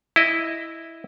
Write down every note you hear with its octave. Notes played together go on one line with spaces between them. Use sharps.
E4 D#5